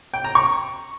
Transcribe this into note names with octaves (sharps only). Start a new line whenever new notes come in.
G5
A#5
C#6